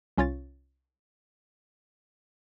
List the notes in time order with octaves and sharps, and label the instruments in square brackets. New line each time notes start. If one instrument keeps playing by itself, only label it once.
[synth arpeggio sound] C2 C#4 F4 C#5 A6